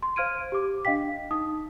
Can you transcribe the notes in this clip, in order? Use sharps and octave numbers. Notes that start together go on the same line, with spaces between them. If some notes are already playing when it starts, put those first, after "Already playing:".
C6
C5 F5 F6 G#6 D7 D#7
G4 D6
D4 D#5 F5 G5 B6
D#4 D#6